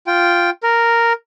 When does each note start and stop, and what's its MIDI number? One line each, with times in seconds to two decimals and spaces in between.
0.07 0.50 65
0.07 0.50 79
0.63 1.13 70